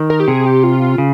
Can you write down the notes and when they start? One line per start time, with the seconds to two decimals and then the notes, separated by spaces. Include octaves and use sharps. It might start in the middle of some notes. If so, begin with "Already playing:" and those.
Already playing: D#3
0.10 A#4
0.20 G4
0.28 C3 G#4
0.46 G4
0.63 F4
0.98 C#3